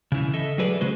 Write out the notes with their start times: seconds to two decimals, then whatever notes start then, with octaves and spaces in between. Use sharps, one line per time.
0.12 C#3 E3
0.33 A4 D#5 E5
0.58 F#3 G#4 B4 D5
0.81 C#3 G#3 F#4 C5